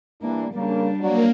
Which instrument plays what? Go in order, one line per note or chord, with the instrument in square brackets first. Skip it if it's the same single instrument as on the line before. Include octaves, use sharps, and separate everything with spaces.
[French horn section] E3 G3 D4 [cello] A#3
[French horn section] C#3 A#3 [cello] G3 D4
[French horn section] F#3 D5 [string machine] A#3